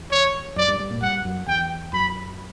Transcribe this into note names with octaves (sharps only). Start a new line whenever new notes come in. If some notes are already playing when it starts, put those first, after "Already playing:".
Already playing: E2
C#5
F#2 D5
G2
G2
A#2
G2 F#5
F#2
E2 G5
F#2 B5